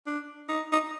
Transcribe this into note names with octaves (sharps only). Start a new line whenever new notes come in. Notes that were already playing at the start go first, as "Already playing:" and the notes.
D4
D#4
D#4